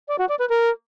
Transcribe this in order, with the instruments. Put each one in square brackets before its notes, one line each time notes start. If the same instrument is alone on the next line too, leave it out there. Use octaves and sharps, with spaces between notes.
[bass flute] D5
F#4
D5
B4
A#4